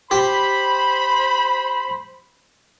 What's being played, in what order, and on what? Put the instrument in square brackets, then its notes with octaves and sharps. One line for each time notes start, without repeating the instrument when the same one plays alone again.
[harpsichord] G4 [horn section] C5 B5